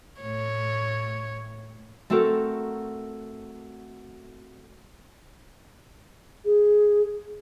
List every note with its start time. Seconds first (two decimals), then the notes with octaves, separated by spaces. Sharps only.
0.21 A2 C#5
2.10 A3 C4 F#4 A4 A#4
6.45 G#4